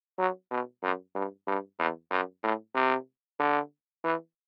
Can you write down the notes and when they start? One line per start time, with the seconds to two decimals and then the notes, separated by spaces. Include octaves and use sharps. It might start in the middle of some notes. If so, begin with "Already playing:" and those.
0.19 F#3
0.51 B2
0.82 F#2
1.15 G2
1.47 G2
1.79 E2
2.11 F#2
2.43 A2
2.75 C3
3.39 D3
4.04 E3